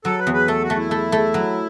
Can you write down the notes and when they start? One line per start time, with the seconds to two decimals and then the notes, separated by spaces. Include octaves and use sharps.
0.05 F#3 A4
0.19 B4
0.27 E2
0.34 B4
0.48 A3 A4
0.63 F#4
0.70 A3
0.77 E4
0.91 A3
1.12 A3
1.34 F#3